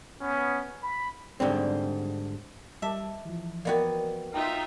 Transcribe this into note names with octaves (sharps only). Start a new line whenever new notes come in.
B3 C#4
B5
G#2 D3 G3 C4
G3 D#5 E5 A5 D6
E3 F3
A#3 B3 F#4 D5 D#5 G5
D#4 F4 B4 E5 G5